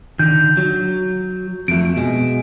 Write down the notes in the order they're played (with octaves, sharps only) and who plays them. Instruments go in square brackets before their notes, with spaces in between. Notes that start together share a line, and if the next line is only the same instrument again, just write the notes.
[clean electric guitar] D3 D#3 [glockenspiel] G6
[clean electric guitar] F#3
[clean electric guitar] F2 A3 [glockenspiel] D7
[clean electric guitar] B2 G#3